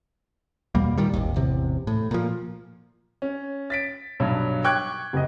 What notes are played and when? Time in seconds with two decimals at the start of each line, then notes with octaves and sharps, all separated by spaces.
0.75 E2 B2 G3 A#3
0.97 A#2 D#3 G3
1.13 D#1 G#1 D#2
1.36 A1 E2 C3
1.87 A2
2.11 A#2 F3
3.22 C#4
3.70 A6 B6 D7
4.20 B1 G2 F#3
4.64 G5 C#6 D6 F#6 G#6
5.13 F#1 D#5